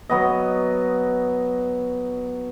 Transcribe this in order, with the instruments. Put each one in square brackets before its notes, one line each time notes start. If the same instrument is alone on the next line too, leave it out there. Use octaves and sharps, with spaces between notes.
[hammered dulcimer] F#3 B3 D#5